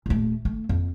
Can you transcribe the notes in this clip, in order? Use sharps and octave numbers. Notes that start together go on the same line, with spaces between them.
D#1 A3
A3
F2